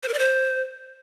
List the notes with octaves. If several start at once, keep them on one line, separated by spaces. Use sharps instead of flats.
C5
A#4
D5
C5